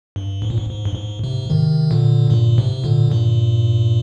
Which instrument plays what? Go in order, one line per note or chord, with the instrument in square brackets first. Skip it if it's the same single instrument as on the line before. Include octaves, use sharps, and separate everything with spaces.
[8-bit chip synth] G2
G#2
A#2
G#2
G#2
G2
G#2
G#2 C3
C3 D#3
A#2 D3
G2 A#2
G#2 C3
A#2 D3
G2 A#2